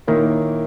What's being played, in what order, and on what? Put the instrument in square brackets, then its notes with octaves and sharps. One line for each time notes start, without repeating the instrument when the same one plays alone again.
[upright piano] A#2 A#3 E4 A#4 C#5 [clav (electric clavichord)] D#3